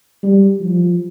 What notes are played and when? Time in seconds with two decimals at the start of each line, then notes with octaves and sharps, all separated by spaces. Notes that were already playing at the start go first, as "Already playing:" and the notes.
0.23 G3
0.61 F3